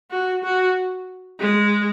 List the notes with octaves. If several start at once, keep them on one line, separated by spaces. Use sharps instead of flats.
F#4
F#4
G#3